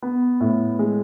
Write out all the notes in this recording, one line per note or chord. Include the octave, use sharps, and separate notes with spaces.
B3
A2
G#3